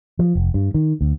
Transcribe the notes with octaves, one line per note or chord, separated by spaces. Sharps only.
F3
F1
G2
D#3
D2